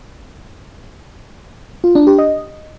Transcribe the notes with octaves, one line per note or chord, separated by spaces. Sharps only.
F4
D4
G4
D#5